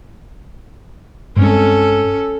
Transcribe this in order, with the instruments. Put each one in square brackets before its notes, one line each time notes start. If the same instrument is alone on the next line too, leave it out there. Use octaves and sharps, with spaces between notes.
[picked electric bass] G2 G#3 C4 [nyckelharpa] C#4 A4